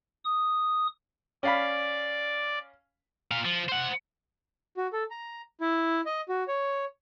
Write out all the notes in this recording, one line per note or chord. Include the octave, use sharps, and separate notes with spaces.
D#6
C#4 D5 F5 B5
A#2 F5
F3
C5 F#5
F#4
A4
A#5
E4
D#5
F#4
C#5